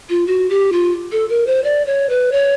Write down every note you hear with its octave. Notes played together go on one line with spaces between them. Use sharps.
F4
F#4
G4
F4
A4
A#4
C5
D5
C#5
B4
C#5